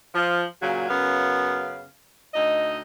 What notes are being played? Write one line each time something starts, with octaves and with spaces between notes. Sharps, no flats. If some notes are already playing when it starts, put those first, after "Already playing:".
F3
A#2 C#3 F#3
F#2 C#3 B3 F5
D2 D#4 D#5